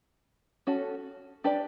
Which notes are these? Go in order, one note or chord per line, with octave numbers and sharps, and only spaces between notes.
C#4 F#4 A4
D4 G4 B4 D5